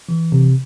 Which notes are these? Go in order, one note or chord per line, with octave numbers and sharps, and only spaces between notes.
E3
C3